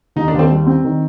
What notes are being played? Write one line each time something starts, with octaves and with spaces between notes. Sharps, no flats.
D#2 D#4
D4
D#2 C4
G3
C4
D#3